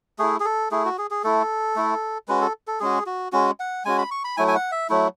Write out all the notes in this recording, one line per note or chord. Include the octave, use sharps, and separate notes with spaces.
A3 E4 G#4
G#4
A4
A3 E4 G#4
F#4
G#4
G#4
A3 E4 A4
A3 E4
G#3 C#4 F#4 B4
A4
A4
G#3 C#4 F#4 G#4
F#4
G#3 C#4 F#4
F#5
G#3 C#4 F#4 G#5
B5
C#6
B5
F#3 A3 E4 G#5
G#5
F#5
E5
F#3 A3 E4